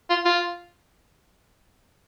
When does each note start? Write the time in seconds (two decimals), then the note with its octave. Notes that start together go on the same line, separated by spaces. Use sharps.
0.10 F4
0.25 F4